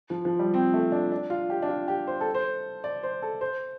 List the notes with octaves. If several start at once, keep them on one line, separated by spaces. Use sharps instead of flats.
F3
F3
G3
C4
A3
D4
D4
F4
G4
D4
F4
G4
C5
A4
C5
D5
C5
A4
C5